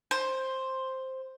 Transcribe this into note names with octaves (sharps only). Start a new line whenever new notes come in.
C5